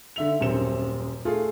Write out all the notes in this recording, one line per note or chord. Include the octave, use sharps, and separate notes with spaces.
D3 E5 F7
D#1 F#2 C4 E7
A3 F4 G#4 A4